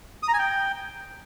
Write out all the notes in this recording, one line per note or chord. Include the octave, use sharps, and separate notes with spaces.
D#6
A#5
G#5
G5